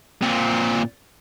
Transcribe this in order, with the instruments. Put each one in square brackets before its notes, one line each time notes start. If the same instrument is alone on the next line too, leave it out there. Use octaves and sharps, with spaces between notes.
[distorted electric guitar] A#2 C4